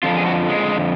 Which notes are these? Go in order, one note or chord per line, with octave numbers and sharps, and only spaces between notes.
F2 D3 F3 F4
G#4
F#4
G#3